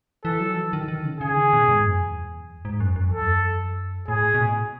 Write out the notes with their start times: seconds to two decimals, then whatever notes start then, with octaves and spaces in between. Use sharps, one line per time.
0.24 E3 A4
0.40 F#3
0.57 E3
0.73 D#3
0.88 D#3
1.05 C#3
1.20 C#3 G#4
1.36 D#3
1.53 B2
1.69 G#2
1.84 F#2
2.00 E2
2.65 G#2
2.80 F#2
2.96 F#2
3.09 E2 A4
3.23 F#2
4.08 A2 G#4
4.34 B2
4.41 A2